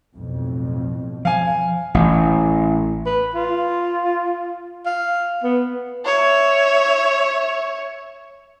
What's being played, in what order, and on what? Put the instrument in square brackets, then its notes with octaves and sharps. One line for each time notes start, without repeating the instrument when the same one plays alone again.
[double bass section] B1 F2 A2
[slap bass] F3 [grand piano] F5 G#5
[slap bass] A1
[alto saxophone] B4
F4
F5
B3
[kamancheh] C#5 E5